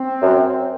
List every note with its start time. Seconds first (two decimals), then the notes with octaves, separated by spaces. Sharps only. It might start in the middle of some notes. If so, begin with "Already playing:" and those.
Already playing: C4
0.22 F#2